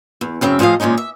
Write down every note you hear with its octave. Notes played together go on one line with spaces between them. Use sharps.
E2
F#2 C#3 C4 E5
A2 F3 G#4 D#5 F5
A#2 D#3 G#3 C#4 D#4
E5